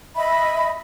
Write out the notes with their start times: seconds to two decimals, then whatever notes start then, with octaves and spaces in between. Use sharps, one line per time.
0.15 D#5 E5 B5